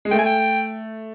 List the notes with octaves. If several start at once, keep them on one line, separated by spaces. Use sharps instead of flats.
G#3
A3 G5
G#5
G5